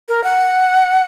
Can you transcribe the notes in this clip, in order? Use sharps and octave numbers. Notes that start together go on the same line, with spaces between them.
A#4
F#5